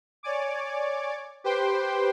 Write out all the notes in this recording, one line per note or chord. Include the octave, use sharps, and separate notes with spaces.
C#5 D5 G#5 D6
G4 B4 C5 G5 C6